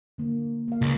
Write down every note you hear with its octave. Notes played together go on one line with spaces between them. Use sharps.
D3 A#3
A#3 F5
C#2